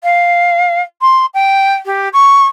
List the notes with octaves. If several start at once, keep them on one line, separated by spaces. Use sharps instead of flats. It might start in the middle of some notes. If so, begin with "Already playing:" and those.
F5
C6
G5
G4
C#6